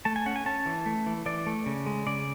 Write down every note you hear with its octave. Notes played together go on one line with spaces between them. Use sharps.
A3 A5
G#5
C#4 F#5
G#5
C#4 A5
E3
A3
E3
E3 D5
A3
C#3
G#3
C#3 D5